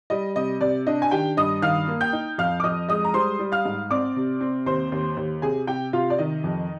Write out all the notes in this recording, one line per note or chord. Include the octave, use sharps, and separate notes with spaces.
G3 D#5
C3 D#5
C3 D5
D4 D#5
G#5
D#3 G4 G5
G2 D#5 D#6
D#3 F5 F6
A#3
G5 G6
D#4
F2 F5 F6
D6
F2 D#5 D#6
G#3 D#5 D#6
A#5
G3 C5 C6
G3
F5 F6
G#2
C4 D5 D6
C3
C4
D#2 C5 C6
D#2
D#2
C3 G#4 G#5
C3 G4 G5
C3 F4 F5
D5
D#3 D#5
F2